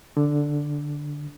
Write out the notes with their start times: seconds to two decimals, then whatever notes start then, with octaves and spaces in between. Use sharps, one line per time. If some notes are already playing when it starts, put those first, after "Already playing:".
0.17 D3